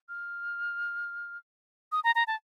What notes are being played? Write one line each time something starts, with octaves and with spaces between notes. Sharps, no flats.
F6
D#6
A#5
A#5
A5